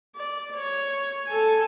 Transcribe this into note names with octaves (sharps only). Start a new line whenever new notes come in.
D5
C#5
A4 G#5